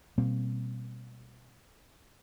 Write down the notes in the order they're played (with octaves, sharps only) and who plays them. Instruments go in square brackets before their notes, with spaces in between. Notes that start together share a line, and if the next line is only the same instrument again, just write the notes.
[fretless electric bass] B2 G3 A#3 C4